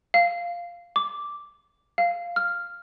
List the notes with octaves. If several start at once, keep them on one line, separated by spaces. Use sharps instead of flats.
F5
D6
F5
F6